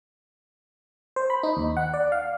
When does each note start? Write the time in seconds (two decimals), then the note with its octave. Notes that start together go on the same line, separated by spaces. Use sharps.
1.16 C5
1.30 B5
1.43 D#4
1.57 D#2
1.77 F#5
1.94 D5
2.12 F5